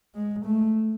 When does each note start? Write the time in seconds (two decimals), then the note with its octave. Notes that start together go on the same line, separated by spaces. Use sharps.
0.15 G#3
0.45 A3